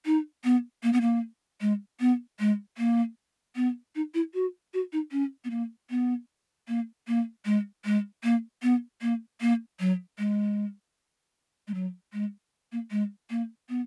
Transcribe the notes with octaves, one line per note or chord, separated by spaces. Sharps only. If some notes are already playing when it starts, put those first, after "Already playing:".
D#4
B3
A#3
B3
A#3
G#3
B3
G#3
A#3
B3
D#4
E4
F#4
F#4
D#4
C#4
B3
A#3
B3
A#3
A#3
G#3
G#3
A#3
B3
A#3
A#3
F#3
G#3
G#3
F#3
G#3
A#3
G#3
A#3
B3